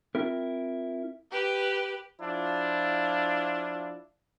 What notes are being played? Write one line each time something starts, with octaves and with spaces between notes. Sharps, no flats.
C4 E4 F4 A#4
G4 B4
F3 D4 E4 F4